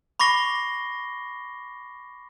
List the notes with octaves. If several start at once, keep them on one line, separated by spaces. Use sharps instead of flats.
B5 C#6 D6 A#6 C7 G7